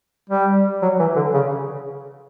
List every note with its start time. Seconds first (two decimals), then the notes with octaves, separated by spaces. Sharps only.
0.30 G3
0.82 F#3
0.99 E3
1.16 D3
1.34 C#3